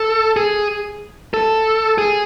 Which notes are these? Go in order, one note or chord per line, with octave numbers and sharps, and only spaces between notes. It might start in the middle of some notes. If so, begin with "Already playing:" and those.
Already playing: A4
G#4
A4
G#4